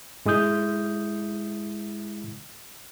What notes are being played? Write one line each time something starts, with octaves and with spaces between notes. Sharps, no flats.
G#2 G#3 E4 D#6 G6